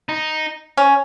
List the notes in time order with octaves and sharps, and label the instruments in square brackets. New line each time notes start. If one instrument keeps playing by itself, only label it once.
[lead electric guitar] D#4
[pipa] C#4